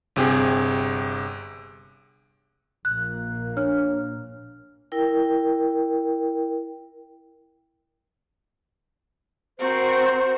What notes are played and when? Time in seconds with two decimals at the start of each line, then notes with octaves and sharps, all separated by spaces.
0.16 G1 C3 G4 G#4
2.85 A#1 A#2 A#3 F#6
3.57 D4 C#5 F6
4.92 E4 A#4 G5
9.59 C4 F#4 A#4 C5